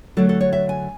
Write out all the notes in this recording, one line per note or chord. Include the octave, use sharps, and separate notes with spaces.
D3 F#3 A3 A4
A4
C#5
E5
G#5